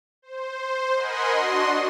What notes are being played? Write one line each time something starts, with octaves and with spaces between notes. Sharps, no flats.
C5
A#4 D#5 F#5 G#5 B5 C6
D4 F#4 D#5 C6